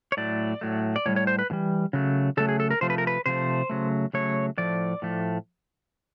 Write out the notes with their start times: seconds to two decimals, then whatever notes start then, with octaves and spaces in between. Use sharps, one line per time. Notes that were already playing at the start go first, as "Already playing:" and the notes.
0.12 C#5
0.17 A2 F#3 A3 D5
0.61 A2 F#3 A3
0.96 D5
1.06 A2 E3 G3 C#5
1.16 C#5
1.27 C5
1.39 B4
1.50 A2 E3 G3
1.93 C#3 F#3 A3
2.37 C#3 F#3 A3 A4
2.49 G#4
2.60 A4
2.71 A#4
2.81 C3 F3 A3 C5
2.90 B4
2.98 A#4
3.07 B4
3.26 C3 F3 A3 C5
3.69 C#3 F#3 A3
4.13 C#3 F#3 A3 C#5
4.58 A2 F3 A3 D5
5.02 A2 F3 A3